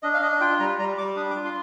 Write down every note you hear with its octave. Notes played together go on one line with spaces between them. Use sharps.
D4 D#5
F5
D4 D#5
F4 G5
G3 A#5
G3 A#5
G3 D6
D4 D#6
D6
F4
C6